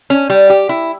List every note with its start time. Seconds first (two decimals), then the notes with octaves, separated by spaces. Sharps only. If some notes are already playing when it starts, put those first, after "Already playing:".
0.10 C#4
0.30 G3
0.50 G4
0.69 E4